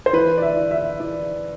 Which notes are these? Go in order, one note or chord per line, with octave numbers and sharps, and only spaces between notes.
C5
E3 B4
D5
E5
E3
E5
E3 D5